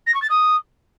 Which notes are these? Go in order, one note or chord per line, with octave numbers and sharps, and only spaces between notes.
A#6
C#6
A6
D#6